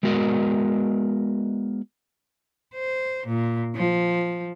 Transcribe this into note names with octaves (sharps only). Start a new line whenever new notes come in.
G#3 B3 F#4 A#4 D5 D#5
C5
A#2
F3